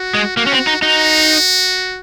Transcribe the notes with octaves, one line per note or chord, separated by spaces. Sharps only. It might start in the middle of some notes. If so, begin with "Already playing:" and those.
Already playing: F#4
G#3
A#3 F#4
C#4
C4
D#4
D#4 F#4